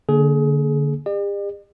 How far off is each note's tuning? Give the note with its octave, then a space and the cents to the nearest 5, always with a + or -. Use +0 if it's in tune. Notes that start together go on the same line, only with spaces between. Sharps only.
D3 -5 A#3 +0 G#4 +25
G4 +45 D5 +45